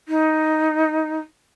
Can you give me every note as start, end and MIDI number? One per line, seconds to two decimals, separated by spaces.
0.08 1.20 63